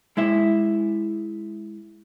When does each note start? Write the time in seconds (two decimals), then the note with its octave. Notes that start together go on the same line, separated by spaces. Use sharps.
0.17 G#3 E4 E5